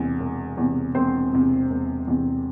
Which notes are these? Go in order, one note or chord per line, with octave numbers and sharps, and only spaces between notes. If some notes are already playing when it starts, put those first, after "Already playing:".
Already playing: E1 E2 C3
E1
E2 C3
E1 C4 C5
E2 C3
E1
E2 C3